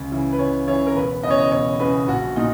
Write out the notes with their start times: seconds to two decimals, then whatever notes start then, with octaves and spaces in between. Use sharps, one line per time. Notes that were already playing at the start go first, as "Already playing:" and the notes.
Already playing: C#2
0.12 C#3 E3
0.33 B4
0.39 C#2 C#5
0.68 C#3 E3 C#5
0.87 A#4
0.95 E1 B4
1.23 E2 C#3 D#5
1.30 C#5
1.38 D#5
1.52 E1 C#5
1.80 E2 C#3 B4
2.08 A#1 F#4
2.36 A#2 D#4